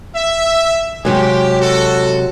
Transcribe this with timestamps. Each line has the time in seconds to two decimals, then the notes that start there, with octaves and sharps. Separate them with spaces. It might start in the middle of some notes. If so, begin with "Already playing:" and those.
0.15 E5
1.05 C3 F#3 G#3 G4
1.60 F#4 A4